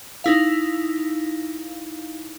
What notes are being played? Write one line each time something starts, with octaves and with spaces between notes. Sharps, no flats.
D#4 E4 F5